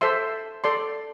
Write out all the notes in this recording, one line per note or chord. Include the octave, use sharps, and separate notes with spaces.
A4 C5 E5 C6
A4 D5 C6